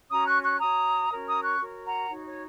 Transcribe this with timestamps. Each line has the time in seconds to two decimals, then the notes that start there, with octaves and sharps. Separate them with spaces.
0.10 C#4 F#4 C#5 A#5 D#6
0.27 C#6 F#6
0.43 C#6 F#6
0.60 F#4 C#5 A#5 D#6
1.10 C#4 F#4 A#4 C#5
1.27 A#5 D#6
1.43 C#6 F#6
1.60 F#4 A#4 C#5
1.85 F#5 A#5
2.09 D#4 F#4 C#5
2.27 C#5